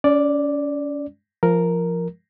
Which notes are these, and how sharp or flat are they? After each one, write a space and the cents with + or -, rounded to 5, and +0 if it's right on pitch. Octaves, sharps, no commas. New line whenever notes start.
C#4 +35 D5 +0
F3 -15 A#4 +0